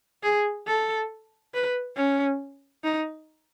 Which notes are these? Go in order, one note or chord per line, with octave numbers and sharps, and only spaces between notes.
G#4
A4
B4
C#4
D#4